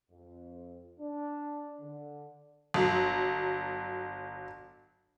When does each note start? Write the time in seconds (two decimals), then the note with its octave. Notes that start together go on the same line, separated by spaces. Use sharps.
0.11 F2
1.00 D4
1.81 D3
2.74 G1 F#3